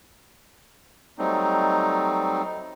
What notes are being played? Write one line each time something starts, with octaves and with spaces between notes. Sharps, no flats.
F#3 G3 A3 C4 D#4